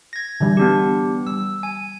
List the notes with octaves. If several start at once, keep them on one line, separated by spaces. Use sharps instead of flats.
G#6 A#6
D3 E3 G3
B3 D4 G4
G3 E6
G#5